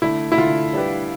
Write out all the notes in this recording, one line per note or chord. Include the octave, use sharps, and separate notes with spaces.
D3 A3 D4 E4
E4
D3 A3 D4 F4
G3 D4 G4 B4